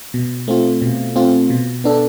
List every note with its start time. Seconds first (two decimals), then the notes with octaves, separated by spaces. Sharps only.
0.14 B2
0.48 A3 C4 F4
0.82 B2
1.16 A3 C4 F4
1.50 B2
1.84 B3 D4 A4